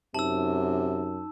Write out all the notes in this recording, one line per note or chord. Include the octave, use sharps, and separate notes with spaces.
F#2 C3 D#4 A5 E6